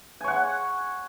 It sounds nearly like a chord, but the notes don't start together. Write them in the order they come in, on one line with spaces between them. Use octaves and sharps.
G#5 C#5 F#5